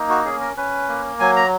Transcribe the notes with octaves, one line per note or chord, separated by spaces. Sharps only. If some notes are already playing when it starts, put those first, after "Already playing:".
Already playing: A#3 D#4
F#4
C#4 G#4
A#4
C#4 B4
A#3
F#3 G#5
A#5